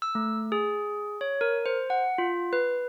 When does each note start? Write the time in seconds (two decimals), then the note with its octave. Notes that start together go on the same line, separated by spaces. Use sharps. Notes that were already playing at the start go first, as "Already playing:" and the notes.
0.02 E6
0.15 A3
0.52 G#4
1.21 C#5
1.41 A#4
1.66 C5
1.90 F#5
2.18 F4
2.53 B4